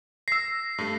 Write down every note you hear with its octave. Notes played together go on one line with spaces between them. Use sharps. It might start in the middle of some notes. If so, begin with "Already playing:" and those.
E6 A#6 C7
G2 A3